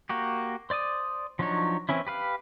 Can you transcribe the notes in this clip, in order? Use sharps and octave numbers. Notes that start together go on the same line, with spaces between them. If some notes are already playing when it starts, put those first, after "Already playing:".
A#3 F#4 G4
C5 D5 D6 D#6
F3 F#3 D4 D#4 C#5
E3 C4 C#4 E4
G4 B4 F5